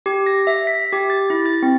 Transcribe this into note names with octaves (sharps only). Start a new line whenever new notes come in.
G4
A#6
E5
B6
G4
A6
E4
A6
C4